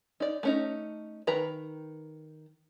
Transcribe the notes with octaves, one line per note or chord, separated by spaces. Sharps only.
D#4 D5
A3 C#4 D#4
D#3 B4 A#5